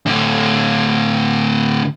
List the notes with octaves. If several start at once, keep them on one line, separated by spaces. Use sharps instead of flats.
A2 D3